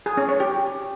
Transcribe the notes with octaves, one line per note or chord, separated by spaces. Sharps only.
G#4
C#4
C#5
G4